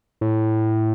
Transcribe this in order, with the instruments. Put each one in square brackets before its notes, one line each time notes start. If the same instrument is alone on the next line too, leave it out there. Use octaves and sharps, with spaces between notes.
[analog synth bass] A2